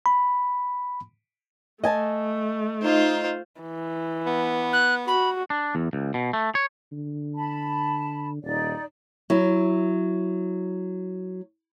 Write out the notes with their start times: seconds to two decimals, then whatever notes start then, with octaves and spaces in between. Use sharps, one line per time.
0.06 B5
1.83 A3 D#5 G#5 A5
2.83 D#4 F4 C5
3.62 E3
4.26 B3
4.72 F#6
5.07 F#4 B5
5.50 D4
5.75 E2
5.93 C#2
6.14 B2
6.33 A3
6.55 C#5
6.92 D3
7.35 A5 B5
8.43 D#1 D#4 D5
9.30 F#3 E4